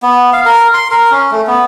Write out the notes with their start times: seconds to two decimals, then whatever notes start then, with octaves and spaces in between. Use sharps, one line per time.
0.03 B3
0.33 F5
0.45 A#4
0.74 C6
0.91 A#4
1.11 C#4
1.31 A3
1.47 B3